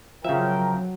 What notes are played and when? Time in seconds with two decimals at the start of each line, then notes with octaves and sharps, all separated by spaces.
0.24 C#3 F3 F#3 A#4 E5 G5